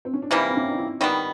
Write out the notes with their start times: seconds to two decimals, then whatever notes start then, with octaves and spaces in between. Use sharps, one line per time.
0.05 C4
0.14 C#4
0.22 D4
0.31 C3 E3 G3 A#3 D#4
0.49 C4
0.56 C#4
0.64 D4
0.71 D#4
0.78 E4
1.01 D#3 G3 B3